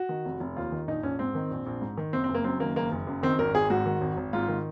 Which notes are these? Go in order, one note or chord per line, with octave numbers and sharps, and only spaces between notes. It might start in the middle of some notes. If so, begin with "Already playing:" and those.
Already playing: F#4
D#3
F1
F1
D#2 F4
D#3
A#1 D#4
A#1 C#4
G#2 C4
D#3
A#1
A#1
G#2
D#3
F#1 C4
C4
F#1
A#3
F#2 C4
D#3 A#3
F#1 A#3
F#1
F#2
D#3 C4
G#1 A#4
G#1 G#4
G#2 F#4
D#3
G#1
G#1
G#2 F4
D#3